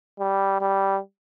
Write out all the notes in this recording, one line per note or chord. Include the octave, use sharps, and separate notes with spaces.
G3
G3